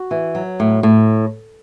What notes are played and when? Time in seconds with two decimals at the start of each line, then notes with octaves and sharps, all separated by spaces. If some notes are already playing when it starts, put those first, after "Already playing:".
Already playing: F#4
0.11 E3
0.35 F#3
0.60 A2
0.83 A2